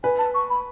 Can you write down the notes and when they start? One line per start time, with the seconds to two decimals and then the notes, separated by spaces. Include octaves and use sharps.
0.03 B4 G#5
0.18 A5
0.34 C#6
0.50 B5